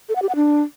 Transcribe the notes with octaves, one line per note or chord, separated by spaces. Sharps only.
A4
F#5
G4
F#5
D4